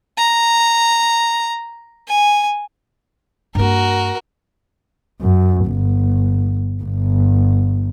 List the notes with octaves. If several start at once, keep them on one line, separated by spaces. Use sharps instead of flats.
A#5
G#5
G2 A#3 F#4 A#4
F#2
G1
G1